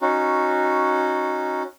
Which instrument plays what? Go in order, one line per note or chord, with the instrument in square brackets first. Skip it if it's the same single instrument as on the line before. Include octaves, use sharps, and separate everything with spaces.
[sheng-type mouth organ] C#4 D#4 F#4